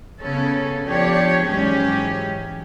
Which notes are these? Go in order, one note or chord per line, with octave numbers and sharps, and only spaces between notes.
C#3 B3 C#4 A4
F3 B3 D4 G4 C#5
G#2 E3 F#3 C#4 G4 G#4